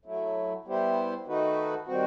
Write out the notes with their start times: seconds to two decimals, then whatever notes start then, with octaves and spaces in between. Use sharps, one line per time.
0.05 F#3 A3 E4
0.66 G3 B3 E4 G4 C5
1.26 D#3 A3 D#4 F#4 B4
1.86 D#3 G3 C4 F#4